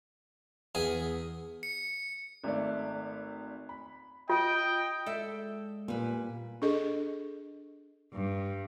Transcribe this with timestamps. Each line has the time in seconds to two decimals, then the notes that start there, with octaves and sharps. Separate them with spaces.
0.75 E2 G#4
1.63 C#7
2.44 G#1 A3 D5
3.69 B5
4.30 F4 D#5 G5 D#6
5.06 G#3 A4 D5 E5
5.88 A#2 G3 B4 G#5
6.62 D4 G#4 A4 D#5
8.13 G2